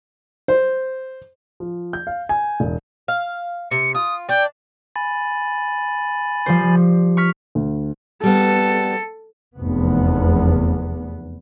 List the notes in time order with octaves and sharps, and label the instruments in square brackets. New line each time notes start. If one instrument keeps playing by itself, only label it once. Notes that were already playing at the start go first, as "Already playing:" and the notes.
[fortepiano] C5
[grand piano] F3
G6
F5
G#5
E1
[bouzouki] F5
[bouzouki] C3 [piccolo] C#7
[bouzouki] F4 [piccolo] D#6
[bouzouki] D4 D5 [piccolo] G5
[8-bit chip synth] G#5 B5 A6
[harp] F3 G3 C5
C#6 F6 B6
[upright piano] D2
[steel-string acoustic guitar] G3 B3 [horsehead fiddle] A4
[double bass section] F1 E2 B3